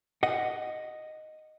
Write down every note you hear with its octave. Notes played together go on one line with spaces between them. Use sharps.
D#5 F#5